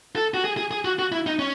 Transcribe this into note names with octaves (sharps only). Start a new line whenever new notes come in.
A4
F#4
G#4
G#4
G#4
F#4
F#4
E4
D#4
C#4